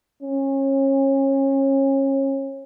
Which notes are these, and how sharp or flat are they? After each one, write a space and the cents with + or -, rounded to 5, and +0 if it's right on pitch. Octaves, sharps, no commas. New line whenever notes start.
C#4 -30